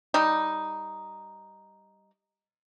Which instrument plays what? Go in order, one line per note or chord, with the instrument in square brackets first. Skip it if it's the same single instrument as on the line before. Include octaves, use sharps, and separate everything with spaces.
[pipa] G3 D#4